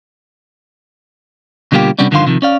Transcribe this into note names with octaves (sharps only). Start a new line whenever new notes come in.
B2 D3 G3 A#3 F4 G4
C3 G3 B3 C#4 D4
G2 D3 D#3 F3 F5 C6
C3 D#3 F3
C#4 D5 F5